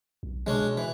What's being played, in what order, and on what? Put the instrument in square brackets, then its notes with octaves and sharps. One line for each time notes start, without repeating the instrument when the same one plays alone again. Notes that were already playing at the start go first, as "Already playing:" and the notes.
[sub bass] B1
[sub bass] B2 [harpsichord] G#3 C#4 D4
[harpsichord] E3